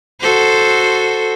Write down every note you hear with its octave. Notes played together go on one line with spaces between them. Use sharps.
F#4 A4 C5